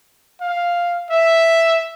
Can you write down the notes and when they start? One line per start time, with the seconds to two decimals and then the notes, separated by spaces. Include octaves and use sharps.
0.41 F5
1.10 E5